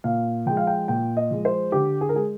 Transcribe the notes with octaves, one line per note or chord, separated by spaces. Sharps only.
A#2 F5
F3 G#3 G5
F5
G5
A#2 G5
D#5
F3 G#3
C5
D3 G4
G#4
A#4
G#3 G#4